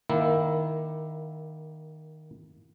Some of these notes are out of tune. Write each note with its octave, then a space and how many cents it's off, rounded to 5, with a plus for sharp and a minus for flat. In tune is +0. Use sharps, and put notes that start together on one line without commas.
D#3 +0 A#3 +20 E4 +0